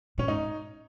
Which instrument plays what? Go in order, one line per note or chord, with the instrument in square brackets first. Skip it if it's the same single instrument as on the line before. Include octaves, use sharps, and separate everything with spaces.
[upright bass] A#2 [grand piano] C#4
[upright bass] G#2 [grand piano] D#4